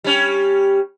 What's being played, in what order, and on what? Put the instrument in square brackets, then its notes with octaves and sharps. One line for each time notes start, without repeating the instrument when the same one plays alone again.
[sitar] G3 C#4